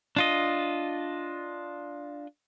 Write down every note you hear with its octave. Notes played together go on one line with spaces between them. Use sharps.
D4 F4 D#5